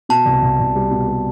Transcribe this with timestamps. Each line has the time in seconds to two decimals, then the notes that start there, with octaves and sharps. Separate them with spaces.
0.09 B2 A5
0.25 C2
0.42 C2
0.59 C2
0.75 G3
0.91 B2
1.08 G3